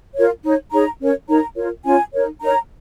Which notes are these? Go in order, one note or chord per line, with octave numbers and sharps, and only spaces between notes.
F4 A#4 C#5
D#4 C#5
D#4 G#4 C#5 A#5
C#4 A#4 C#5
D#4 A#4 C#5 A#5
F4 A#4 C#5
C#4 F4 C#5 G#5
D#4 A#4 C#5
D#4 A#4 C#5 A#5